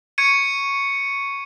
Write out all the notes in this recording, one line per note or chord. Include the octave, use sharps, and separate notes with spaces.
C#6 G#6 C#7 D#7